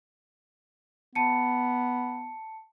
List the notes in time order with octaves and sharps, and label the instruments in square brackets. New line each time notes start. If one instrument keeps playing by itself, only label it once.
[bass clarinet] B3 [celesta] A5 C#7